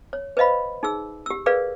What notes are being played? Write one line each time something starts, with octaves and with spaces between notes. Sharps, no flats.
C#5
B4 C5 D#5 F5 B5
D#4 G#4 E6
G4 E6
G#4 A#4 B4 D5 F5